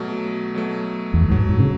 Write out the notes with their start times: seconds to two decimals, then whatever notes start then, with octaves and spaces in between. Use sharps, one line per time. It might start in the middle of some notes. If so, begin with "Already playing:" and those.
Already playing: B2 F#3 A3
0.54 B2 F#3 A3
1.14 E2
1.21 F#2
1.29 G#2 B2 F#3 A3
1.49 G#2
1.60 C#3